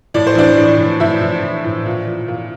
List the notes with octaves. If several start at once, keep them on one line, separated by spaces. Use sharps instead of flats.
A2 D5
C5
E3 D4 D5
A2
A2
A2 E4 E5
A2
A2
A2
A#2
A#2
A#2